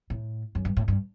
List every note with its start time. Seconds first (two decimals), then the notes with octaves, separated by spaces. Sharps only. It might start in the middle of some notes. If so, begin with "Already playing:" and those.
0.10 A2
0.55 F#2
0.65 G2
0.77 A2
0.88 G2